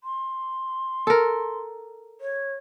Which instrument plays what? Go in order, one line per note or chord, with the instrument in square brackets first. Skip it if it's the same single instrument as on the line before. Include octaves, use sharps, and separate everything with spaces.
[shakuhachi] C6
[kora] A4 A#4
[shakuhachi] C#5